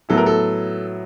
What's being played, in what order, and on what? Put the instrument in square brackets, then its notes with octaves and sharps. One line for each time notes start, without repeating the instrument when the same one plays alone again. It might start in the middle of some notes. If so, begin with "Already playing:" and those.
[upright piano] A2 F#3 B3 E4 [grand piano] A4
[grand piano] A#4
A4